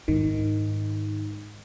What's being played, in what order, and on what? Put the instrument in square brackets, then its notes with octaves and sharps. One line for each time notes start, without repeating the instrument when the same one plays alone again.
[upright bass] G#2 [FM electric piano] D#3